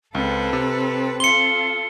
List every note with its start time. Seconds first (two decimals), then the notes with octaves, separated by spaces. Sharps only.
0.15 C#2 C4 A4 B4
0.53 C3
1.20 F4 A4 C6 C#7 G7